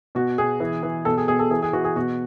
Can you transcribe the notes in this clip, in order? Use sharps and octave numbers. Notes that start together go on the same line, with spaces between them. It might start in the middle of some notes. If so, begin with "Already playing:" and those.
B2 F#4
B2 G#4
E3
E3
B2 A4
G#4
B2 G#4
A4
E3 G#4
G#4
E3 F#4
G#4
B2 F#4